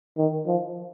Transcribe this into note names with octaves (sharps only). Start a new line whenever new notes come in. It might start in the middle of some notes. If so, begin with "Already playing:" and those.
D#3
F3